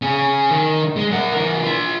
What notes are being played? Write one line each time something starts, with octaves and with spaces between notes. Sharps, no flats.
C#4 G#4
D#3
G#3
A#4 F#5
E3 A#4
F4 B5